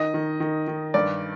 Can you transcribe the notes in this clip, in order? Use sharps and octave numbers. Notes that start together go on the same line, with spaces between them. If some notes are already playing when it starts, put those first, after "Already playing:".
Already playing: D#3 D#5
D#3
D#3
D#3
G2 D5